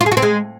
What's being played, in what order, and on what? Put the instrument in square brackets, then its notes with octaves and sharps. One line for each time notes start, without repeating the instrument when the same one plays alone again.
[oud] F4
G#4
F#4
C4
G#3